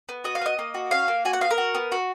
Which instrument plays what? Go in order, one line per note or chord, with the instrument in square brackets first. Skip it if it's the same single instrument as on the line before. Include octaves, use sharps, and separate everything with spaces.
[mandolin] B3
F#4 D#5
F5
B3 D#5
A#3
F#4
C#4 F5
A#3
F#4 G#5
F#5
B3 F5
A#4
F#4
B3
F#4